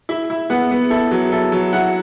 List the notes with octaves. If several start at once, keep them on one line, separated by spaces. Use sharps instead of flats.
E4 E5
E4
B3 F#5
B3
E4 A4
F#3
E4 A4
F#3
E4 F#5